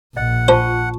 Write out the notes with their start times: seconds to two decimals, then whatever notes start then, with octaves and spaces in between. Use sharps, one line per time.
0.17 A#1 D#5 F#5
0.48 F4 C5 A5 C#6